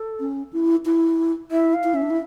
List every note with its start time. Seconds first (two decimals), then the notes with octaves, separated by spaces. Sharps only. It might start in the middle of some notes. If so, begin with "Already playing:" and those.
Already playing: A4
0.20 C#4
0.53 E4
0.86 E4
1.51 E4 E5
1.74 F5
1.84 E4
1.94 C#4 E5
2.02 D4
2.10 E4